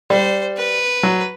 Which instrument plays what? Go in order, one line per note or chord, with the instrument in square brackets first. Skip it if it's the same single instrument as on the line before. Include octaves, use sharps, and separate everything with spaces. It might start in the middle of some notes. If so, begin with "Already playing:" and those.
[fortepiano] G3 [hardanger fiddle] C5
[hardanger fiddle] B4
[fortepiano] F#3